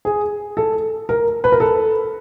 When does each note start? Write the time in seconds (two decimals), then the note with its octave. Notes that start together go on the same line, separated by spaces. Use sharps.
0.05 G#4
0.57 A4
1.09 A#4
1.44 B4
1.52 A#4
1.60 A4